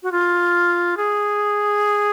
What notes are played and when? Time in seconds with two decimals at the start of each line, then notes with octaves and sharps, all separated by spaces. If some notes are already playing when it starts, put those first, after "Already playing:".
0.03 F#4
0.12 F4
0.97 G#4